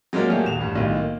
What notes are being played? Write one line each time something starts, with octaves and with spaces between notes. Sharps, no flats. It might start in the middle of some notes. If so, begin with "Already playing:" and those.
F#3 G#3 A#3 C#4 A#4 D5
F#3 A3 A#3 G4 G#4
D#1 D#2 E7 F7
A1 G2
B1 A2 D#3 F4
A#3